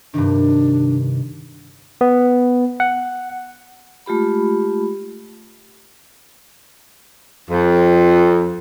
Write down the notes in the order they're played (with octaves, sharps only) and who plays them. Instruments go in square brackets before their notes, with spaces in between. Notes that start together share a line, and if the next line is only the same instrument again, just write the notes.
[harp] G2 C3 D#3 [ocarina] D4
[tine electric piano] B3
F#5
[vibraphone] G#3 A3 F4 G4 B5
[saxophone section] F2